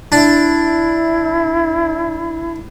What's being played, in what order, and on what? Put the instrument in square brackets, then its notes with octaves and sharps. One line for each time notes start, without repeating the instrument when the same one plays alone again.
[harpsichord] D4 [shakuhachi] E4